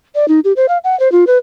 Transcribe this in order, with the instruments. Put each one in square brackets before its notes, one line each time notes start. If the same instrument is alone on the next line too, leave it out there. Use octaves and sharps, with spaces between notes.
[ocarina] D5
D#4
G4
C5
F5
F#5
C5
F4
B4